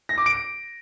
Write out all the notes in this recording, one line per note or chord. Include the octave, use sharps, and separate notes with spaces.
A#6
D6
D7